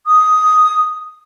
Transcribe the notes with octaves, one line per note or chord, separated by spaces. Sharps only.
D#6